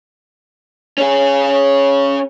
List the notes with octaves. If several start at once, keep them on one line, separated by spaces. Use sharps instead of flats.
C#4 G#4